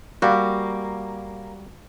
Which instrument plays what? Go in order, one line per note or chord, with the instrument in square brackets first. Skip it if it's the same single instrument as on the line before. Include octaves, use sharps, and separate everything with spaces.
[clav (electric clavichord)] G3 F#4 [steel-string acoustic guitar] A#3